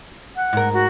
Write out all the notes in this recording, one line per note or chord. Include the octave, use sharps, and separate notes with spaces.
F#5
G#2 A#4
F#4